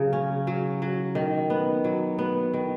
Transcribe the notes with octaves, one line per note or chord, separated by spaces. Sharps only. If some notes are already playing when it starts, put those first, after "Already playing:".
Already playing: C#3 F#3
C#4
F#3
F#3
D#3
B3
F#3
B3
D#3